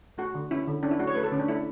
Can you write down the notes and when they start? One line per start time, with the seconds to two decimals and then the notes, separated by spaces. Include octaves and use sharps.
0.18 A3 F#4
0.35 D3
0.51 C#4 E4
0.68 D3
0.83 C#4 D4
0.91 E4
0.99 A3 F#4
1.07 C#5
1.15 A3 B4
1.24 A4
1.32 D3 C#4
1.40 D4
1.48 A3 E4